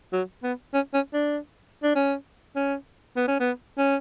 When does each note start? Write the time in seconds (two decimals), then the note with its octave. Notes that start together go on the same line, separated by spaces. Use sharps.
0.13 F#3
0.43 B3
0.74 C#4
0.94 C#4
1.13 D4
1.83 D4
1.95 C#4
2.56 C#4
3.16 B3
3.28 C#4
3.40 B3
3.78 C#4